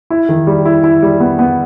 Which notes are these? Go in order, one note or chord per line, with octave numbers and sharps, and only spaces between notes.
E4
D#3
G3
E4
E4
G3
B3
B3